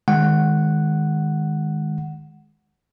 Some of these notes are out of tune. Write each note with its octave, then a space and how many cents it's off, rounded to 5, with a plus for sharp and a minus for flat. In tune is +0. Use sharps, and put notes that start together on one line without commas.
D#3 +0 G#3 +0 F#5 +0